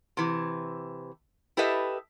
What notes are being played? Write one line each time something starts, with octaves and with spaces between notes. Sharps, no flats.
C3 E3
E4 G4 A4 B4 D#5 E5